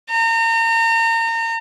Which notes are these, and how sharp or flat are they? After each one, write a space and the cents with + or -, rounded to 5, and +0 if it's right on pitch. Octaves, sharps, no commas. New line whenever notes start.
A#5 -35